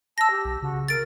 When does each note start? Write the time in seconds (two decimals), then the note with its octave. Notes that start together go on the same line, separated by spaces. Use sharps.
0.18 A5 E6 A#6
0.30 G4
0.45 B1
0.62 C#3 F#4
0.88 A#4 A6 D7